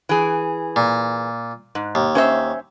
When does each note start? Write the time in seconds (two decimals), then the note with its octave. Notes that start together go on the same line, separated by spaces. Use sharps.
0.09 E3 G#4
0.76 A#2
1.75 G#2
1.95 D#2
2.15 C#4 C5 E5